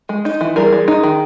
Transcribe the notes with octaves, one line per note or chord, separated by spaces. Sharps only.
G#3
D#4
E3
G3 G#4 A#4
G3
D#4
D#3